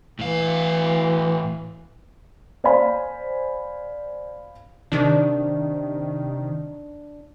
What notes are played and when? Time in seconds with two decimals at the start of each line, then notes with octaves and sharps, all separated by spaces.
0.19 A2 E3 F5
2.64 C5 D5 F5 G#5 B5
4.92 C3 D#3 D4